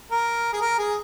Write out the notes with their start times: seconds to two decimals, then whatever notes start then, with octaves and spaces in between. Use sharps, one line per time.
0.11 A#4
0.53 G#4
0.61 A#4
0.78 G#4